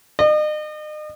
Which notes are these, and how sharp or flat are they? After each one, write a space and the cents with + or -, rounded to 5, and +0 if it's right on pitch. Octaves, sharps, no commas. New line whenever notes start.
D#5 -40